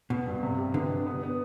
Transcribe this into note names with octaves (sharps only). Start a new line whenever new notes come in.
B2 B3
G2
C3
G4
D3 B3
B2
B3
B3